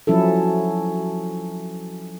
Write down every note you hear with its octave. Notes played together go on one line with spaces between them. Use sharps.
F3 F#3 C#4 E4 A4